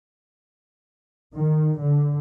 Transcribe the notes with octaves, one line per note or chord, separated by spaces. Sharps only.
D#3
D3